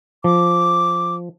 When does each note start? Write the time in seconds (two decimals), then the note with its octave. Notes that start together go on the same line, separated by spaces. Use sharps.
0.24 F3 D6